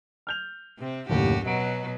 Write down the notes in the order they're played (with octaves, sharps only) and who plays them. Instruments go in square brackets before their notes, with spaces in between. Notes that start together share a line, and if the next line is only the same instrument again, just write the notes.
[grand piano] F6 G6 F7
[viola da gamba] C3 C4
[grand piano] F#1 D#2 A2 [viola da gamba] F#4 G4
[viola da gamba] B2 F#3 [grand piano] D#5 A#5 D7